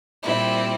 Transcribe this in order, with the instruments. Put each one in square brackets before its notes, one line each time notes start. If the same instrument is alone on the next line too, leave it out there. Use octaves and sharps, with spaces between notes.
[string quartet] A#2 G3 C4 E4